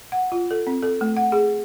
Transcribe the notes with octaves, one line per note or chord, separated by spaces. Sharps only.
F#5
F4
A4
C4
A4
A3
F#5
G#4